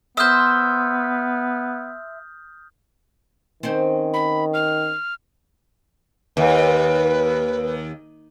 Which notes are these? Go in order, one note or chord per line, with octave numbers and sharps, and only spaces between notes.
B3 C5 E5 D#6 F6 G6
D#3 C4 C#4 C5
B5
F6
D#2 B4